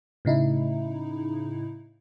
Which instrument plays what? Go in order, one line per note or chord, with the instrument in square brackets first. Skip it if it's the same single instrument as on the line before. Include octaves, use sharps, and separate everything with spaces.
[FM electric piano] A2 C#3 D#4 E4